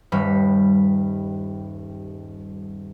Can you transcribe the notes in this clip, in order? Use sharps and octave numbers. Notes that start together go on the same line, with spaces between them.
D#1 G2 G3 B5